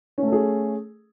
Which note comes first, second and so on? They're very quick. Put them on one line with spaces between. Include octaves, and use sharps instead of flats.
C#4 A3 A4 G#4